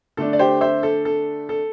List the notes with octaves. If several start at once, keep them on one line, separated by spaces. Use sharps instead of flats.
D3 A3 D4 A4
D5
G4 C5
C5 E5
A4
A4
A4